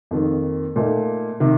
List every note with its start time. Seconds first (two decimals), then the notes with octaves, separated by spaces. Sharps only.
0.11 F2 D#3 A#3
0.76 A#2 A3 D#4
1.40 C3 D#3